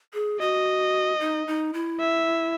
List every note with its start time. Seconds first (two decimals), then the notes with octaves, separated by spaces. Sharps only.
0.14 G#4
0.40 F#4 D#5
1.20 D#4
1.47 D#4
1.74 E4
2.00 E5